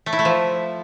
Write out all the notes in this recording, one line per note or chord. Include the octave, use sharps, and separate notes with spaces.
A3
E4
A3
F3